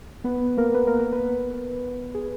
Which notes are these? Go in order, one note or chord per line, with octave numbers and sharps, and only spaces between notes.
B3 B4
A#3 A#4
B3 B4
A#3 A#4
A#3 A#4
B3 B4
G#4